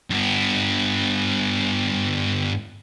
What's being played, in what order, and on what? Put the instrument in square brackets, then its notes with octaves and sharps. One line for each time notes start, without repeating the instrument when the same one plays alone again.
[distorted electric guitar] G2 B3